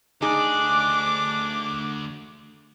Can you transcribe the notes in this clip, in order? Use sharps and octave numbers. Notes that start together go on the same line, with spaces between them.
D2 D4 D#4 G#4 D5 D6